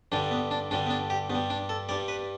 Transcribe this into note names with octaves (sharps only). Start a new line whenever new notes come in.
G2 D3 G3 D4
B3
D4
G2 D3 G3 D4
B3
D4
G4
G2 B3
G3
D4
A4
G2 G3 D5
B4